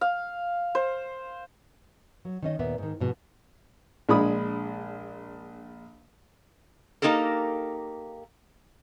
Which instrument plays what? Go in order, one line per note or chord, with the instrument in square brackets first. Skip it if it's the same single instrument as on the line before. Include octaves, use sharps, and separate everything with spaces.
[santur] F5
C5
[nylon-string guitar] F#3
D#3 C#4 D#5
D#2 A#2 B3 D5 E5
G#2 D#3
G#2 B2 F3
[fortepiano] A#1 G#3 D4 B5 D#6
[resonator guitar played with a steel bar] A#3 D#4 G4 A4 A#4